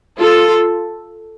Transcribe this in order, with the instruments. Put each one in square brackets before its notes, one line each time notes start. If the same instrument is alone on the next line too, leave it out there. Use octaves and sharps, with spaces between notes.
[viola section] F4 A4